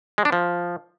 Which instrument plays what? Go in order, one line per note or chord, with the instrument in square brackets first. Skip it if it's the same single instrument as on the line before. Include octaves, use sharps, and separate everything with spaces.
[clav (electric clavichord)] G#3
D4
F3